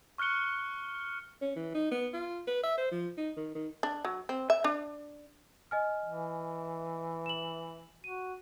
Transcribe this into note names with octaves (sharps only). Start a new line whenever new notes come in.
C#6 F6 F#6 C#7 G7
C#4
E3
D#4
B3
F4
B4
E5
C5
F3
D#4
D#3
D#3
D4
F#3
C4
E5
D4
D#5 G#5 F6
E3
E7 F#7
F#4 D#7